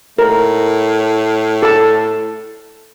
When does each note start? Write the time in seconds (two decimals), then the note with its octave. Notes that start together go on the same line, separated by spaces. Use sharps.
0.19 A2 A#4
1.63 A4 A5